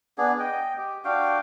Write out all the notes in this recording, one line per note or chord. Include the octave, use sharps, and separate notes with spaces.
B3 D4 G#4
D#5 G5
G4
D4 F#4 F5 G5